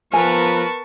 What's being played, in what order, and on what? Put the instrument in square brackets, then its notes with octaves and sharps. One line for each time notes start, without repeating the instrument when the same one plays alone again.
[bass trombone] F3 [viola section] B3 A#4 B4 [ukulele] G#5 [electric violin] A5 C#6